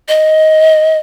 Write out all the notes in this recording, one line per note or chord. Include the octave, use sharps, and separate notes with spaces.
D#5